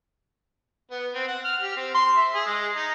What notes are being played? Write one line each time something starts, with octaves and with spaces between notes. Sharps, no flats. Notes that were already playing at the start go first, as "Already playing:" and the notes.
B3
C4
F#5
F6
G4
C4
C6
E5
G#4
G#3
D#4